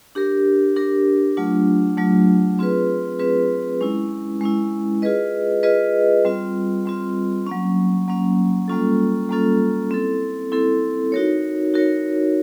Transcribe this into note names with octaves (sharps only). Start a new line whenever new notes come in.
D4 G4 A#4
D4 G4 A#4
F#3 A3 D4 F4
F#3 A3 D4 F4
C4 F4 G#4 B4
C4 F4 G#4 B4
G#3 C#4 E4
G#3 C#4 E4
F4 G#4 B4 D#5
F4 G#4 B4 D#5
G3 C4 F4
G3 C4 F4
F#3 A#3 C#4
F#3 A#3 C#4
G3 A#3 C#4 F4 A4
G3 A#3 C#4 F4 A4
C4 E4 A4
C4 E4 A4
D#4 F#4 A#4 C#5
D#4 F#4 A#4 C#5